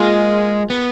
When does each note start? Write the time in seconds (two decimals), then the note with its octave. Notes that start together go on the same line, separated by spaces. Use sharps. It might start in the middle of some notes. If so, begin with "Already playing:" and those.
Already playing: G#3 A#3 F4 G#4 D#5
0.70 B3